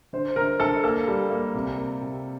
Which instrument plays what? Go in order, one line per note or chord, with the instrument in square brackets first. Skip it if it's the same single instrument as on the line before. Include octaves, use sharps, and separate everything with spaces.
[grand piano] D3 C5
D3 A#4
D3 A4
A#3 A4
G3
A#3
C3
A#3
C3